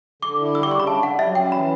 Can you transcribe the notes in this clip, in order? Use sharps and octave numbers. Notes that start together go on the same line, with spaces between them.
D3 D6
E4
G3 E6
D6
C#3 C#6
B5
D4 A5
G3 F#5
F#3 E5
C#4 G5
E3 B5